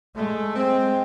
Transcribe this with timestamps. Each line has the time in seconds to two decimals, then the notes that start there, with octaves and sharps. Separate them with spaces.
0.16 G#3 A3
0.56 G#3 C4